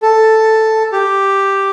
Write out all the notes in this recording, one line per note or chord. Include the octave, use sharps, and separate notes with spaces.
A4
G4